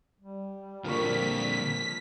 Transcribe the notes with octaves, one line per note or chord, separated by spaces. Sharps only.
G3
A#2 D3 F3 A#3 C#6 B6